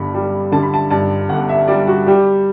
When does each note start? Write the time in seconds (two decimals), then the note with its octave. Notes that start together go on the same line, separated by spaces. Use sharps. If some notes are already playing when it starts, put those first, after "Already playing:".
Already playing: G1 G2 B5
0.14 G3
0.52 D3 A5
0.62 B5
0.74 A5
0.90 G2 A5
1.29 G1 F#5
1.49 E5
1.68 G3 D5
1.87 F#4
2.07 G3 G4